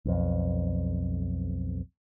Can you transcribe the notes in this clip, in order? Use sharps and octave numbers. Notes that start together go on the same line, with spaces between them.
B1 F2